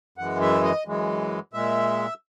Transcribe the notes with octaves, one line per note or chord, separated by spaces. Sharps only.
F#2 E3 G#3 F#5
E5
D#5
F#2 E3 G#3
A#2 G#3 E5